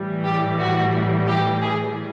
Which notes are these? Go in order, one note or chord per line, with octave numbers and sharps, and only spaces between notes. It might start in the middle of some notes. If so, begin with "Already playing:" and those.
Already playing: A2 E3 G3
G4
F#4
G4
G#4